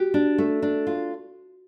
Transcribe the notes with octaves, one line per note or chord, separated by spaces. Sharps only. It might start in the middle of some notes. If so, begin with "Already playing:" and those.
Already playing: F#4 G4
D4
A3
D4
F4